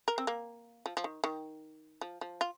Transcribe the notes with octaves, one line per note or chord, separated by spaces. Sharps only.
A#4
C4
A#3
F3
F3
D#3
D#3
F3
F3
F4